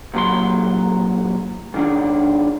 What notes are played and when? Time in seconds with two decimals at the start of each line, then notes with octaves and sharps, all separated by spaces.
0.14 C2 A#2 F#3 C6
1.74 G#2 D#3 D4